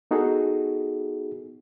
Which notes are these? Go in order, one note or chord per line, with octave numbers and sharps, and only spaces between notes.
B3 D#4 F#4 G#4 A4